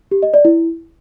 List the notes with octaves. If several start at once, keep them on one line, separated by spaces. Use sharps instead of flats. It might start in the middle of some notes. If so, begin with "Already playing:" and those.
G4
D#5
D5
E4